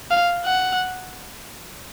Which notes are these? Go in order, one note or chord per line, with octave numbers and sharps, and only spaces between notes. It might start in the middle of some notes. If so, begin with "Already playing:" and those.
F5
F#5